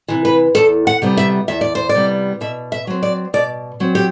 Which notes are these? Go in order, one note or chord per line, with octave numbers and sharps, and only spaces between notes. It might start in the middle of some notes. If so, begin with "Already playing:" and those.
C3 E3
B4
E2 A4
F#5
C3 G3 B3
E5
E2 E5
D5
C5
D5
C3 G3 B3
B2 E5
E5
F#3 C4
D5
B2 D5
F#3 C4
G4